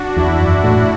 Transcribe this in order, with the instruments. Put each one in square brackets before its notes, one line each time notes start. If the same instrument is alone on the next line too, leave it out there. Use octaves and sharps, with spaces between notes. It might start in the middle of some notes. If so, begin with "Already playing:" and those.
Already playing: [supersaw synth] D4 F#4
[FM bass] E2 [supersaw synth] E4
[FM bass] F#2
A2